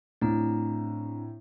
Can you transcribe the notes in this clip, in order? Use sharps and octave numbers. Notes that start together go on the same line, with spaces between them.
A2 C4 D4 A#5